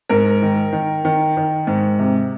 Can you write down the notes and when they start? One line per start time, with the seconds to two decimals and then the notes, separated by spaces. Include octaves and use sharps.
0.09 G#2 A#4
0.42 D#3
0.73 D#3
1.05 D#3
1.37 D#3
1.67 G#2
1.99 C3